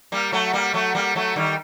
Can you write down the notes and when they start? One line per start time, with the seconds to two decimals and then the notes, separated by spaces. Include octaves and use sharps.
0.12 G3 A#3
0.32 F#3 A3
0.53 G3 A#3
0.74 F#3 A3
0.95 G3 A#3
1.16 F#3 A3
1.36 D#3 G3